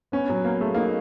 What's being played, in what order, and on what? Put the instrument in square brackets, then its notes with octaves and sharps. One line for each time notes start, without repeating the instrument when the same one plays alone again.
[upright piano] B3 [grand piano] C#4
[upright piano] F#3
[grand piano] A#3 [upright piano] B3
[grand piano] A3 [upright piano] G#4
[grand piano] A#3 [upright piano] D#4